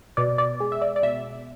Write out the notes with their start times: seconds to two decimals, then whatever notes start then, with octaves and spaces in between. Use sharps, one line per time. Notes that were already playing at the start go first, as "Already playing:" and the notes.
0.17 B2 D5
0.38 D5
0.60 G#3
0.72 E5
0.82 D5
0.96 D5
1.03 B2 E5